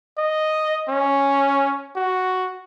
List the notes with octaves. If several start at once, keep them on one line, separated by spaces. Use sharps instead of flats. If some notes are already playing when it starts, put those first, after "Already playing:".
D#5
C#4
F#4